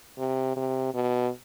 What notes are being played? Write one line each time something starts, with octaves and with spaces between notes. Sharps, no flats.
C3
C3
B2